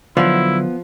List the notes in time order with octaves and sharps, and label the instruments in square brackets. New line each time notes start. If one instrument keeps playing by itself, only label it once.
[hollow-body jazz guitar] D3 F#3 [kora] F3 [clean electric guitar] B3 F5 [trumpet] E4